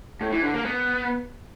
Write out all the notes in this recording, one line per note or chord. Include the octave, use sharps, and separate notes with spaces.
A2
E3
D3
A#3
B3